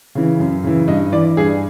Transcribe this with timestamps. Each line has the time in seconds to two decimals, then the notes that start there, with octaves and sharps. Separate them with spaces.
0.15 C#3 E3
0.40 F#2
0.64 C#3 E3
0.87 G2 D#5
1.12 E3 D5
1.37 G2 G#4